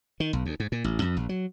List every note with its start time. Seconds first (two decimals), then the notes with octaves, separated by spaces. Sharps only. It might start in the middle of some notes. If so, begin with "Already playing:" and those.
0.20 D#3
0.33 B1
0.46 D2
0.60 G#2
0.72 A#2
0.84 A1
1.02 F2
1.17 A#1
1.29 F#3